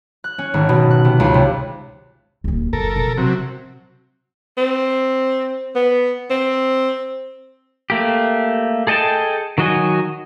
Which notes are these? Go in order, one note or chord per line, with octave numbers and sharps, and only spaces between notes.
F#6
C#4
G#1
B2
F#6
C3
C#2
C3
D1 D#2
F#1 A4 A#4
B2 F3
C3 F#3
C4
B3
C4
A3 A#3 G4
G#4 A4 D#5 G5 A5
D#3 F#3 F#4 D#5 G#5